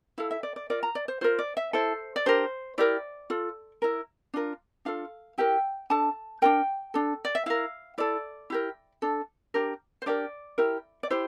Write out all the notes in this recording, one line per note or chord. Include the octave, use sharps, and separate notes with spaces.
E4 A4 F5
E5
D5
D5
F4 A#4 D5
A#5
D5
C5
F4 A#4 C5
D5
E5
E4 A4 C5
D5
D4 G4 A#4 C5
E4 G4 A#4 D5
F4 A4
E4 A#4
D4 F4 A#4
D4 F4 A4 F5
E4 G4 A#4 G5
D4 A4 A5
D4 F4 A#4 G5
D4 A4
D5
E5
E4 A#4 F5
E4 A4 D5
E4 G4 A#4
D4 A4
D4 G4 A#4
C5
D4 G4 A#4 D5
E4 G4 A#4
D5
E4 G4 C5